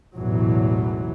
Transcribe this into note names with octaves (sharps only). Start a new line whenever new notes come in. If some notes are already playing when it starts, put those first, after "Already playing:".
A1 E2 G#2 B2 E3 F#3